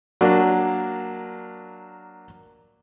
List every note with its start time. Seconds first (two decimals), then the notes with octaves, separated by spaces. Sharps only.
0.21 F#3 A#3 D4